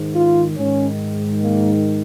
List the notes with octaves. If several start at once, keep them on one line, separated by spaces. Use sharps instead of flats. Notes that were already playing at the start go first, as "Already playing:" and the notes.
Already playing: G#2 D#3
F4
G#2 D#3 C#4
A#3